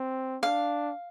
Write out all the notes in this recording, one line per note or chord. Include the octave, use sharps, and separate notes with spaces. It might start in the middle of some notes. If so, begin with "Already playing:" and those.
Already playing: C4
D4 F5